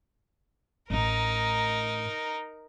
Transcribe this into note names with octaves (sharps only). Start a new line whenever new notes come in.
A1 A2 D#4 A#4